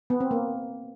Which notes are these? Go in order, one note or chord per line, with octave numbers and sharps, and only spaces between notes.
B3
C4
A#3